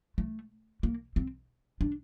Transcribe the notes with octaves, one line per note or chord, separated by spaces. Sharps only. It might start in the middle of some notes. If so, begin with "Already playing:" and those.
A3
A#3
C4
D4